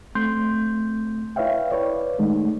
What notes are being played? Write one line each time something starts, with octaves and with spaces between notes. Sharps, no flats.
A3 C4 C6 G6
E4 B4 C#5 E5 F5 G5
B4 C#5 D5
D#3 G#3 A3 D#4